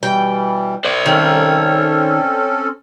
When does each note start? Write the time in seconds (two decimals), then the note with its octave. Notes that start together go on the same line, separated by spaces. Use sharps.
0.03 B2 E3 G3 G5
0.85 C5 D5
1.06 D#3 C4 C#4 A4